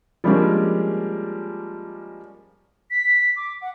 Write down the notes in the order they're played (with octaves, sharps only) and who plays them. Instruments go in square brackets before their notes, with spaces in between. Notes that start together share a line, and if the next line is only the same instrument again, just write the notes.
[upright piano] F3 G3 G#3 A#3 C#4 D4
[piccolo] B6
D6
F#5